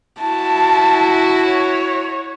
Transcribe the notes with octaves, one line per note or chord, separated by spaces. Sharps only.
E4 F#4 A5
C#5